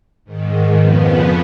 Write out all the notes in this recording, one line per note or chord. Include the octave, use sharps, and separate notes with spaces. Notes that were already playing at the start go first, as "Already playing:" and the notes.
G#2 D#3
F2 C#3 F3 B3